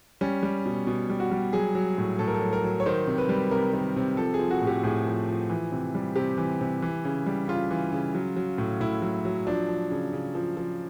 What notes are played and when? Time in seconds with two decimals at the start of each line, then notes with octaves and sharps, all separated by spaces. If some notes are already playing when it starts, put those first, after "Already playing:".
0.21 G3 C#4
0.43 G3
0.66 B2
0.87 B2
1.10 G3
1.20 F#4
1.31 G3
1.53 F#3 G#4
1.75 F#3
1.98 A2
2.19 A2 A4
2.28 A#4
2.34 A4
2.41 F#3
2.53 A#4
2.64 F#3
2.80 C#5
2.86 D#3 C5
3.07 C3
3.18 B4
3.29 G3
3.51 C3 A#4
3.73 D#3
3.96 C3
4.17 F3 A4
4.34 G#4
4.39 F3
4.51 F#4
4.62 A2
4.67 G4
4.83 A2 G#4
5.06 F3
5.29 F3
5.50 E3
5.72 C3
5.95 G3
6.16 C3 G4
6.38 E3
6.61 C3
6.82 E3
7.05 C#3
7.26 G3
7.48 C#3 F4
7.71 E3
7.92 C#3
8.15 F#3
8.36 F#3
8.58 A2
8.80 A2 E4
9.02 F#3
9.25 F#3
9.47 F3 D4
9.68 F3
9.91 C#3
10.13 C#3
10.35 F3
10.57 F3